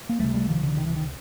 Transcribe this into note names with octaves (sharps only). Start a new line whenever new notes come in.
A#3
C#2 C3 G3 A3
G3 A3
D#3 F3
D3 E3
D#3
E3
D#3